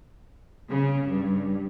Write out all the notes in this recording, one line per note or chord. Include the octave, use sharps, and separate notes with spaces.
C#3
G2